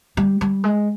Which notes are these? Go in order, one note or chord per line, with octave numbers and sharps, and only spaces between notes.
G3
G3
G#3